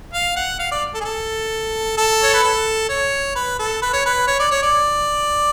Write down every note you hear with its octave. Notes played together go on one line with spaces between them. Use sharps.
F5
F#5
F5
D5
A4
G#4
A4
A4
C#5
B4
A4
C#5
B4
A4
B4
C#5
B4
C#5
D5
C#5
D5